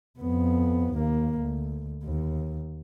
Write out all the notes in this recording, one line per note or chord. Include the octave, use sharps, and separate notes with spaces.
F2 B3
D#2 A#3
D2
D#2